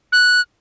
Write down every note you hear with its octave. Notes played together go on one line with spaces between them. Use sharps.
F#6